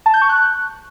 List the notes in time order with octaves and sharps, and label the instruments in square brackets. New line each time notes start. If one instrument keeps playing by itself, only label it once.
[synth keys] A5
G6
C#6
F#6